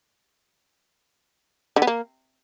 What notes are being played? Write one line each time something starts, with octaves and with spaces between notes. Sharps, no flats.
D3
B3
A#3